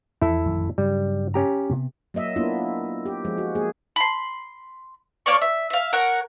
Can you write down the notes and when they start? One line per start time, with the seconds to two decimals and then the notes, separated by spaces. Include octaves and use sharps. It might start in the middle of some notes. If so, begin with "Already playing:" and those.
0.22 E2 F3 E4 A4 E5
0.45 A1 F2 D#3
0.78 G2 C#3 F#3 G3
1.34 C#4 G4 A#5
1.70 C3 B3
2.14 F#3 A#3 D#5 E5
2.36 A#3 B3 D4 E4 F4
3.05 G4
3.25 F3 G#3
3.38 F#4
3.55 A#3 G#4
3.96 B5 C6
5.26 A#3 C#5 D5 C#6
5.41 E5
5.70 E5 F5
5.93 A#4 C#5 F#5